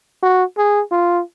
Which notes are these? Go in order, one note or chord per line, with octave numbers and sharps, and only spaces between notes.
F#4
G#4
F4